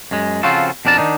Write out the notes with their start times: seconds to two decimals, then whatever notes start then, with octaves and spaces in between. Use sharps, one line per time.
0.11 F#2 G#3
0.43 C#3 F3 C4 F4 F#4 A4
0.85 F2 B2 D4 A#4 A5
0.98 D#3 D4 D#4